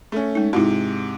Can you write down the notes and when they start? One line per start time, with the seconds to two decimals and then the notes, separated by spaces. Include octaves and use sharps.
0.12 A3 C#4
0.35 G#3 D#4
0.53 G#2 C3 D#4 E4 F#4